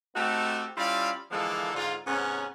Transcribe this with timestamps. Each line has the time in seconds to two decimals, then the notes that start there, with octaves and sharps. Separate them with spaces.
0.16 A3 C4 D#4 F#4 G4 A4
0.77 G3 C#4 E4 F4 D5 F5
1.31 D3 E3 F3 G#3 A#3 A4
1.74 G#2 D3 F4
2.07 G#2 C3 B3 C#4